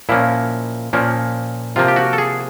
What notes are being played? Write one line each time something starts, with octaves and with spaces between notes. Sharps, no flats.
A#2 F3 A#3 C#4 E4
A#2 F3 A#3 C#4
C3 F3 A#3 F4
G4
F#4
A4
G#4